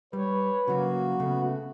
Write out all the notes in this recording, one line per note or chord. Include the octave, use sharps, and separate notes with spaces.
G3 B4 C#5
C#3 F#3 A#3 F#4
C#3 A3 B3